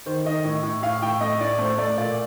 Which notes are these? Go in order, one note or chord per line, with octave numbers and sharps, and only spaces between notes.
D#3 C5
D#3 D#5
A2 D#5
A2
A2 F5
A2 G5
A3 D#5
A2 D5
A3 C5
A3 D5
A#2 D5